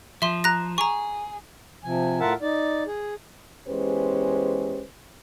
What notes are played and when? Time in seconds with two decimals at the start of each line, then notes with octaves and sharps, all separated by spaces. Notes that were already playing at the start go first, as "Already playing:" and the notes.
0.22 F3 E5 C6
0.44 A#5 F#6 A#6
0.78 G#4 A#5 C#6
1.84 C3 F3 G#5
2.20 A2 F4 A#4 E5 F#5 A5
2.42 D#4 D5
2.87 G#4
3.68 E2 G#3 C#4 G4 B4 C5